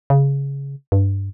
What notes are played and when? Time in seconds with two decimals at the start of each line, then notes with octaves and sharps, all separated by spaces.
0.10 C#3
0.92 G2